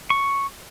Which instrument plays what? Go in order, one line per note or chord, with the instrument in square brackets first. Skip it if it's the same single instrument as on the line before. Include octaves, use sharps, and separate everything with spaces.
[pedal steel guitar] C#6